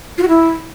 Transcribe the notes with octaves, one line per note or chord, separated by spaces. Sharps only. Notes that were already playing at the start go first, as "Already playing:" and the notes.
F4
F#4
E4